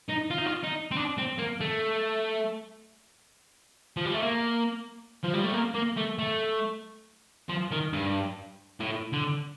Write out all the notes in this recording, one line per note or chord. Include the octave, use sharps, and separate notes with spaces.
D#4
F4
D#4
F4
D#4
C4
D4
C4
A#3
A3
F3
G3
A3
A#3
F3
G3
A3
A#3
A#3
A3
A3
F3
D#3
G2
A2
D3